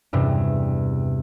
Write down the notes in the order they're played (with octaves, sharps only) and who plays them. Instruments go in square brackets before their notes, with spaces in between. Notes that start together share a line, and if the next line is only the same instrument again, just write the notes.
[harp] E2 G2 C3